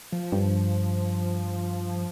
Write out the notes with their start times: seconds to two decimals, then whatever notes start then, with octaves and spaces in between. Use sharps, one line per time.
0.12 F3
0.32 G2